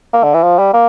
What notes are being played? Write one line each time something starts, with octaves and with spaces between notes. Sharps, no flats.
A#3
D3
E3
F3
G3
A#3